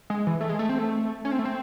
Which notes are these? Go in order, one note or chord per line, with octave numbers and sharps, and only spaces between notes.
G#3
E3
A3
G#3
A3
C4
A3
C#4
C4
A3
C4